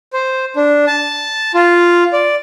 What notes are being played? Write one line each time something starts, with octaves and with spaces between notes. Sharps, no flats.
C5
D4
A5
F4
D5